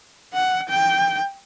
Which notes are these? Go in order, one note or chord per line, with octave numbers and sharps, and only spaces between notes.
F#5
G5